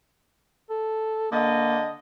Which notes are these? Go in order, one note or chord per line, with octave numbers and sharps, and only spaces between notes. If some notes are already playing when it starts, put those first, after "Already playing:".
A4
D3 A#3 D#5